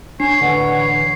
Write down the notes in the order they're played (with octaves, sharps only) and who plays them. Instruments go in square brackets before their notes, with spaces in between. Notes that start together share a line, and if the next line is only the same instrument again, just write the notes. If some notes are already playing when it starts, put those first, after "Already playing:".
[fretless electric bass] D4 [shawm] C#5 [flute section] G#5 [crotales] C7
[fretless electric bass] A1 D3 [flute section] B4 F#5